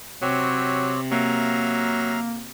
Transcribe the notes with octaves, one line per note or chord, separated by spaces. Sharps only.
C3 F#3 C4 G4 C#5
F#3 A#3 E5 F5 A#5